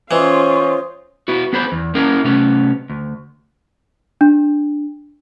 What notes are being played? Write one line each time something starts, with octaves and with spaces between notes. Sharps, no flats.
E3 C#4 F4 C5 C#5 D#5 C6
B3 E4 F#4
B3 G#4 B4 C5 B5
E2
A#3 C#4 E4 G#4 A#4 F#5
C3 A3 B3 C#4
D2
D4